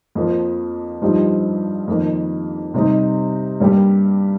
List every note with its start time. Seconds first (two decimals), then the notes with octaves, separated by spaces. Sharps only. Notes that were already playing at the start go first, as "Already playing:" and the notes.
0.15 F2 F3 A#3
1.02 G2 F3 D#4 G4
1.88 F2 D#3 A#3
2.74 C3 G3 D#4
3.60 G2 G3 A#3 G4